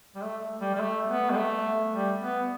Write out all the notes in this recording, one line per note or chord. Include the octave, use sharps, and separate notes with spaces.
G3
A3
G3
G3
A3
B3
G3
A3
G3
B3